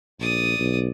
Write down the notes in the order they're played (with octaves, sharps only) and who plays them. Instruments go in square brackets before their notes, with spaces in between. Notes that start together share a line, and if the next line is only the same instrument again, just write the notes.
[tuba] A#1 [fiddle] D5 D#6
[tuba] B1